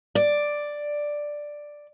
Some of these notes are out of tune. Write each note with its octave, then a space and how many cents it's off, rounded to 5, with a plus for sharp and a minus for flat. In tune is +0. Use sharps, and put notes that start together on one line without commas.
D5 +5